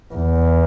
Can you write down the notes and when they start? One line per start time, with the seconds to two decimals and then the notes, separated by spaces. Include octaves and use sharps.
0.14 E2